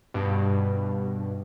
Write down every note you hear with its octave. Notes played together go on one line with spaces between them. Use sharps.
G2 B2